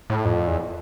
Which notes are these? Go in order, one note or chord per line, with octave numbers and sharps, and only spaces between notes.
A2
F2
E2